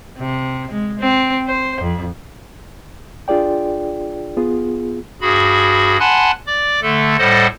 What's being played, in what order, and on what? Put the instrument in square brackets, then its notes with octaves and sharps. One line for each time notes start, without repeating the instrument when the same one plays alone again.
[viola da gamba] C3
G#3
C4
C5
F2
[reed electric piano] D4 F4 G#4 D5 G5
B3 F4 G#4
[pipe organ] G2 F#4 G#4 B5
F#5 G#5 A5 B5 C6 F#6
D5 D6
D3 A3 A4
A2 G3 A4 C5 D#5 F#5